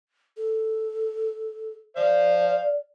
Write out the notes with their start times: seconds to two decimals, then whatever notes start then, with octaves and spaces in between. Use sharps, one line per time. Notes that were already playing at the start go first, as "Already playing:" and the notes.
0.37 A4
1.97 C5 D5 F5